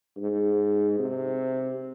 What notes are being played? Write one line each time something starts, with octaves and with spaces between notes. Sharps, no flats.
G#2
C3